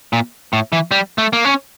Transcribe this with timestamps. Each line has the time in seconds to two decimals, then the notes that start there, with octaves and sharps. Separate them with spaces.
0.13 A#2
0.53 A2
0.73 E3
0.91 G3
1.18 A3
1.33 A#3
1.45 C#4